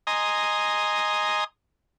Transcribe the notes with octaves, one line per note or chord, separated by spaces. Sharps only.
D#5 G#5 A#5 C6 D#6